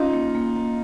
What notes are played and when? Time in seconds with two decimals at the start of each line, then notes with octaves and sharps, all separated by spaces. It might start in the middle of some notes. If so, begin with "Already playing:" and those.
Already playing: C#4 D#4 F4
0.14 A#3
0.35 A#3
0.56 A#3